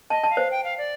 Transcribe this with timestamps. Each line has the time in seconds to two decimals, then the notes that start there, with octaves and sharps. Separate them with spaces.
0.10 D#5 A5
0.24 A5
0.30 F5
0.37 C5
0.51 G5
0.64 F5
0.78 D5